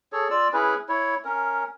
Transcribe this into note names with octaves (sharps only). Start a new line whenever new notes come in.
G#4 A4 C#5
F4 D5 E6
C#4 E4 G#4 B4
E4 C#5
C#4 A#4